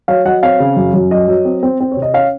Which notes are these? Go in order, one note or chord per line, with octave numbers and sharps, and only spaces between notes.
F#3 C#5 F5
F#3 D#5 F#5
C4 C#5 F5
C#3
F#2
F#2
F#3 D#5
F#3
C4
C4
C4
C#5
C3
D#5
C#4 C#5 F5